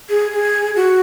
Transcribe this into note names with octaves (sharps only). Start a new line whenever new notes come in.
G#4
G#4
F#4